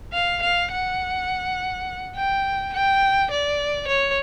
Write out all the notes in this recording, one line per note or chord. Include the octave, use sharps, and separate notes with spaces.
F5
F5
F#5
G5
G5
D5
C#5